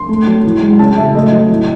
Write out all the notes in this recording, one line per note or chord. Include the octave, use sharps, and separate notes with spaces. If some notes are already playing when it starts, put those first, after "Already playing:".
Already playing: C6
A3
F#3
E3
G#3
C#3 A5
F#3 E5
A3 D#5
F#3
E3